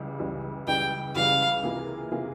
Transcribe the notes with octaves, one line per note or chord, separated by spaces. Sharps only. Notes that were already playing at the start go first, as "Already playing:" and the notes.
Already playing: C#2 C#3 E3 G3
C#2 C#3 E3 G3
C#2 C#3 E3 G3 G5
C#2 C#3 E3 G3 F5
C3 E3 A#3 F4 G#4
C3 E3 A#3 F4 G#4